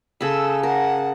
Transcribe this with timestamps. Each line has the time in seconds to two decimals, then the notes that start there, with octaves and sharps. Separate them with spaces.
0.21 C#3 A4 B5 E6
0.63 A#4 F#5 A5